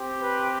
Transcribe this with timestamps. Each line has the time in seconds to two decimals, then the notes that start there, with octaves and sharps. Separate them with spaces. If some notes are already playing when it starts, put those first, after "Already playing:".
Already playing: C4 G4
0.19 B4